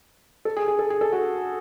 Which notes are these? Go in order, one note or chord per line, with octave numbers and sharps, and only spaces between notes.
A4
G#4
G#4
A4
G#4
A4
F#4